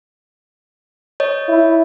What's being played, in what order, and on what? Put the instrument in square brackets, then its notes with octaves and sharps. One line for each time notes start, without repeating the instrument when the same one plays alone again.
[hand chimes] C#5 D#5
[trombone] E4